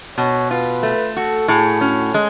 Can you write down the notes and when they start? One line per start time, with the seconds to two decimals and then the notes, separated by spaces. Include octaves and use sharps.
0.18 B2 C#5
0.51 F4 B4
0.83 A3
1.16 F#4 A4
1.48 A2 G#4
1.81 C#4 F#4
2.14 G#3